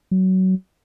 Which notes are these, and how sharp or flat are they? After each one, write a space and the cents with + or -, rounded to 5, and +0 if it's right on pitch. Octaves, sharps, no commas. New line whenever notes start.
F#3 +20